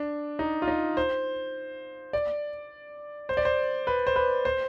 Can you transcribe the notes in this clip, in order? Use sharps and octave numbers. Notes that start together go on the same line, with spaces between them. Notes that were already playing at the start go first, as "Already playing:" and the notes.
Already playing: D4
D#4
F4
D#4
C5
D5
C5
D5
C5
B4
C5
B4
C5